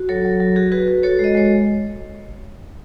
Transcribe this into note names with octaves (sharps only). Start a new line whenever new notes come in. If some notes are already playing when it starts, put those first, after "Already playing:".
Already playing: F#4
F#3 A4 C#5
F#3
F#3
F#4 G#4
F#4 G#4 B4
F#4
F#4 A4 C#5
G#3 D#5
G#3 C#5